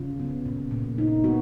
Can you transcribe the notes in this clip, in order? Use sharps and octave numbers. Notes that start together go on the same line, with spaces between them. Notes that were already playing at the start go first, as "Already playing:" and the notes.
Already playing: C#3 F4
B3
A#2
A#2
D#4
B3 F#4